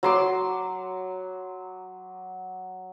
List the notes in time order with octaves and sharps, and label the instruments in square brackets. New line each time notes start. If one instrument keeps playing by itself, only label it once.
[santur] F#3 C6 D6